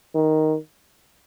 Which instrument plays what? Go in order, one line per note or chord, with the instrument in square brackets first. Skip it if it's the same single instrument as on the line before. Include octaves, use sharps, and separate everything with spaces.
[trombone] D#3